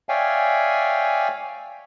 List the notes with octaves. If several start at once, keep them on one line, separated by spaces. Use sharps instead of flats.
C#5 D5 E5 F5 G5 G#5